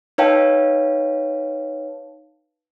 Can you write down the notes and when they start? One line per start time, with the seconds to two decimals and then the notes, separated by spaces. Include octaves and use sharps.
0.18 D#4 B4 C#5 F5 G5 A5